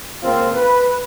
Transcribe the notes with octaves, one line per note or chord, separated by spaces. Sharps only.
C#2 A#3 C4 F4 C5
B4